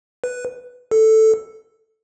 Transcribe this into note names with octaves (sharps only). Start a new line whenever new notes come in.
B4
A4